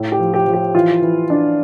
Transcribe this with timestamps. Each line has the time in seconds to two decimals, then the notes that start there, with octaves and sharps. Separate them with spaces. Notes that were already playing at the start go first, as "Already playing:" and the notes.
Already playing: A2
0.12 G4
0.19 F3
0.34 G4
0.47 F3
0.54 G4
0.75 E3 F4
1.02 E3
1.30 D4